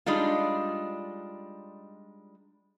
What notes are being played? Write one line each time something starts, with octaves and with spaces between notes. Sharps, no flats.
G3 G#3 D4 D#4 F4